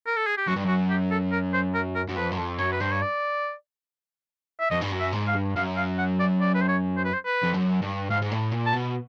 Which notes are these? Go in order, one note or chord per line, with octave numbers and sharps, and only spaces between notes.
A#4
A4
G#4
G4
F#2 F#4
G2
F#2 F#4
G4
A4
A#4
C5
A#4
A#4
F#2
F2 B4
F#2
F2
F#2 C#5
B4
G2 C5
C#5
D5
E5
F2 D#5
G2
F#2
E5
G#2
F5
G2
F#2 F5
F5
F#5
D5
D5
B4
C5
C#5
C5
B4
C5
B4
F2
F#2
G2
G#2 F5
G#2
A2
A#2
A5
B2